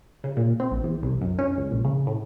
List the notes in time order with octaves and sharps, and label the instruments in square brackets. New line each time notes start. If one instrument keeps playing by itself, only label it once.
[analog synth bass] C#3
A#2
C4
A#1
E2
C2
F#2
C#4
C#2
A#1
C#3
A2